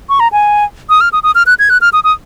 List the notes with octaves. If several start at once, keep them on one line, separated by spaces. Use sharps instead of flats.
C#6
A#5
G#5
D#6
F6
D#6
D#6
F6
F#6
G#6
F#6
F6
D#6
D#6